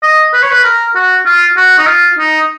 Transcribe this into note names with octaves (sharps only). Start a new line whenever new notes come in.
D#5
B4
C#5
B4
A#4
F#4
F4
F#4
D#4
F4
D#4